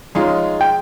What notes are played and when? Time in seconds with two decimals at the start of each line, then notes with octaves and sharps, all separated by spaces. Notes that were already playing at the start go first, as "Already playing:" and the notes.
0.15 G#3 C#4 D#4 F4
0.61 G5